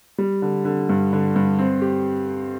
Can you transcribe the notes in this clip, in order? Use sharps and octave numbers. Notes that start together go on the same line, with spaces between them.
G3
D3
D3
G2
D3
G2
C4
G4